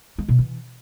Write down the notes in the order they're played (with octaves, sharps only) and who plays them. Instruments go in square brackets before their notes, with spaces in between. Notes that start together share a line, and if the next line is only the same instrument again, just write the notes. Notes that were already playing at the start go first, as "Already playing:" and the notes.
[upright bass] G#3
B2
E3